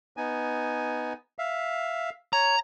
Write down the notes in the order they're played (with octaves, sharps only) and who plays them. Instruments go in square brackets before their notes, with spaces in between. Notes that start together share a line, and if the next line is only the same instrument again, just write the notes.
[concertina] B3 D#4 G#5
E5 F5
[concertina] C#5 [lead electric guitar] A#5